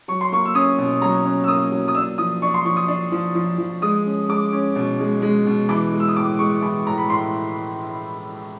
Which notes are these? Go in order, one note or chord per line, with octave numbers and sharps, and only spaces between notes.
F#3 C#6
C6
A#3 C#6
E6
C#4 D#6
B2
F#3 A#5
C#4
E6
A#3 D#6
F#3
D#6
D4 E6
F3 D#6
D4 C#6
C6
F3 C#6
D#6
D4
F3
F3
F3
G#3 D#6
C#4
G#3 D6
C#4
B2
G#3
G#3
B2
E3 D6
G#3
E6
D#6
A2 D6
G#3 C#6
E3
A2 A#5
B5
A2 C6